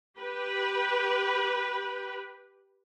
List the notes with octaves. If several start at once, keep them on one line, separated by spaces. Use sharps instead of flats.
G4 B4